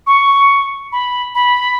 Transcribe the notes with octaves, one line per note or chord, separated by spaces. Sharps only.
C#6
B5
B5